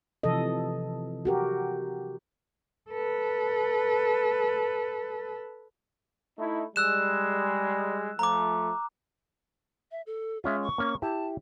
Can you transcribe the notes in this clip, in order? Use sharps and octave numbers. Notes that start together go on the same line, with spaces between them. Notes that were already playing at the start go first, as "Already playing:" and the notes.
C3 E3 F3 A4 D#5
F#4 G4 A#4
A4 B4
A3 D#4 E4
G3 G#3 E6 F#6 E7
F3 A3 A#5 D6
E5
A4
G#3 C#4 F4 E5
C#6
A#3 C#4
E4 G4 A5